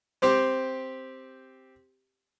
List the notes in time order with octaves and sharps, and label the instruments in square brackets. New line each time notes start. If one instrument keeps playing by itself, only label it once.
[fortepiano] C4 G4 C5